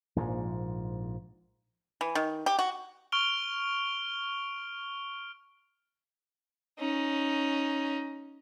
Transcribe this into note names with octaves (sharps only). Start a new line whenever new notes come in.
A#1 G#2 C#3 F3
E3
D#3
G4
F#4
C#6 F6 D7 F7 G7
C#4 D#4